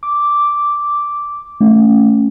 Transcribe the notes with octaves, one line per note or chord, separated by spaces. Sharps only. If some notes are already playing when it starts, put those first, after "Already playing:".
D6
A3 C#4